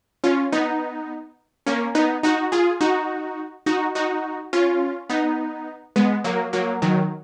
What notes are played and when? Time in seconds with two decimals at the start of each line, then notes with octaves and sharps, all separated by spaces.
0.24 C#4 F4
0.52 B3 D#4
1.66 A#3 C#4
1.95 B3 D#4
2.23 D#4 F#4
2.52 F4 G#4
2.81 D#4 F#4
3.66 D#4 F#4
3.95 D#4 F#4
4.53 C#4 F4
5.10 B3 D#4
5.96 G#3 B3
6.24 F#3 A#3
6.53 F#3 A#3
6.82 D#3 F#3